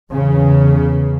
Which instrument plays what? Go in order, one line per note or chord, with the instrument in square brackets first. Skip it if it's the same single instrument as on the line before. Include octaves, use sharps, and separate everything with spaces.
[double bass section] E2 C#3